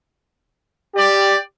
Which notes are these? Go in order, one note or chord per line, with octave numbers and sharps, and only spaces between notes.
G4 D5